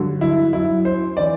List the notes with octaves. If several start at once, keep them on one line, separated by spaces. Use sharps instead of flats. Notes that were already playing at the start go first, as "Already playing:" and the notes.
Already playing: G2 D3 F#3
E4
F#2 F#3 E4
C5
E3 D5